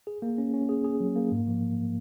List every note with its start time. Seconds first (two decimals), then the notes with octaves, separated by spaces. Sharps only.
0.07 G#4
0.22 A#3
0.38 C#4
0.54 C#4
0.69 G#4
0.85 G#4
1.00 F#3
1.16 A#3
1.32 G#2
1.48 F3